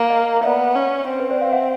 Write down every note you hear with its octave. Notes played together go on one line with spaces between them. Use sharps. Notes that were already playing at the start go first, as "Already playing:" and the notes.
Already playing: A#3
D#5 F5
B3 D5 E5
C#4
C4
B4
C5 D5
F5 G5
E5 F#5